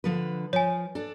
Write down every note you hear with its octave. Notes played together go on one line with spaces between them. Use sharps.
D3 F3 B4
F3 C#5 G#5
D4 A4